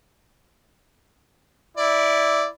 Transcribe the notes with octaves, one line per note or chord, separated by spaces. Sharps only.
E4 D5